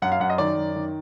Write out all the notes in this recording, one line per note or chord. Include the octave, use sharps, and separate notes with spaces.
F#2 F#5
F5
F#2 F#5
D#5
D#3 D5
F#2
D#3